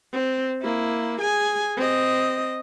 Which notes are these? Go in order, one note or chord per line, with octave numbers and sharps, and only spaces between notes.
C4
A#3 E4
G#4 G#5
C4 D#5